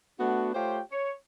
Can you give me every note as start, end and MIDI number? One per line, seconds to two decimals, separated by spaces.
0.20 0.53 57
0.20 0.53 59
0.20 0.53 62
0.20 0.53 66
0.55 0.80 57
0.55 0.80 65
0.55 0.80 67
0.55 0.80 72
0.55 0.80 73
0.55 0.80 79
0.91 1.13 73